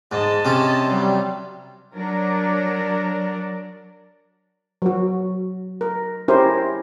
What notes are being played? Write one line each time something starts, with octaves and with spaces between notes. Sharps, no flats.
G#2 D#5 A5
C3 C#4
F#3 G3
F#3 D4 A#4 D5
F#3 F#4
A#4
C#4 E4 G4 A#4 C5